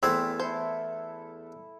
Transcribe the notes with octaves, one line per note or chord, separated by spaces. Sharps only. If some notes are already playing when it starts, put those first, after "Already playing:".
E2 A3 C4 C6 E6 G#6
E4 A4 C5